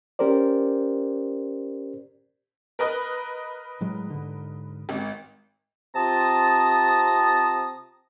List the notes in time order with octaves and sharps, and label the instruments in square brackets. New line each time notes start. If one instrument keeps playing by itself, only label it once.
[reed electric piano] C#4 G4 A#4 C5 D5
[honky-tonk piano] A#4 B4 D#5
[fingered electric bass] A2 F#3 G#3
G#2 D3
[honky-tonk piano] G#1
[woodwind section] C3 C4 F4 A5 A#5 D#6